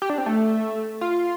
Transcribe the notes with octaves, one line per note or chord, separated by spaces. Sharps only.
G4
D4
C4
A3
F4